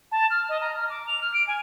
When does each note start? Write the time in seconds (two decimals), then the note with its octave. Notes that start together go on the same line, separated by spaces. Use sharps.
0.12 A5
0.30 F6
0.49 D#5
0.61 A#5
0.77 F6
0.90 D6
1.07 F7
1.21 F6
1.34 D7
1.47 G#5